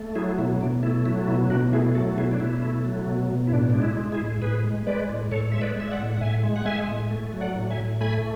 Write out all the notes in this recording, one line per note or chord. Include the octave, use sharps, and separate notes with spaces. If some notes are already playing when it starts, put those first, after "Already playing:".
Already playing: A3
F#3 E4 G#4
B2 E4
B2 D4
A3 E4
F#3 E4
B2 E4
B2 D4 F#4
A3 E4 G#4
F#3 F#4 A4
B2 E4 G#4
D4
B2 E4
A3
F#3
B2
B2
E4
A2 D4
G#3 D4
E4
G#3
E4 G#4
A2
A2 G#4 B4
G#3
G#3 B4 D5
A2
A2 A4 C#5
G#3 E5
B4 D5
G#3 E5
D5 F#5
A2
F#5
A2 E5 G#5
G#3
F#5
G#3 E5 G#5
A2
A3
F#3
D5 F#5
A2
E5 G#5
A2
A3 G#5 B5